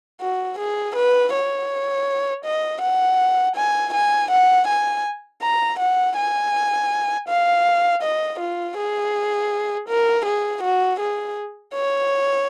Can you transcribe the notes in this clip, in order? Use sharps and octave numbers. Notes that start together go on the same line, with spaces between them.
F#4
G#4
B4
C#5
D#5
F#5
G#5
G#5
F#5
G#5
A#5
F#5
G#5
F5
D#5
F4
G#4
A#4
G#4
F#4
G#4
C#5